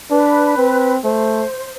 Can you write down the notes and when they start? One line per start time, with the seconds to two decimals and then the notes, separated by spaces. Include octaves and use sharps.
0.11 D4 B4
0.57 C4
1.04 A3 C5